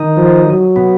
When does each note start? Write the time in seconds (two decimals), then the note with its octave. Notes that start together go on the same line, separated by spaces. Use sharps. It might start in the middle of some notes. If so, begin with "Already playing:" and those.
Already playing: D#3 D#4
0.17 F3
0.46 F#3
0.76 B2 B3